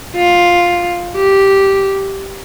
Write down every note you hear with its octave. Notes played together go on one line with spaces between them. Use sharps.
F4
G4